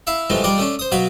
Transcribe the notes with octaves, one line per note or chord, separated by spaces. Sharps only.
E4 E5 F5
G2 E3 F3 G#3 A3
G3 D4 F4 D5 D#5
A3 C#4 D4
C5 D#6
B2 F#3 F5 B5